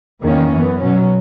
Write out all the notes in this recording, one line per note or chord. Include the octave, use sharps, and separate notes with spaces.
E2 D#3 A#3 C#4
F#2 E3 B3
B2 F#3 C#4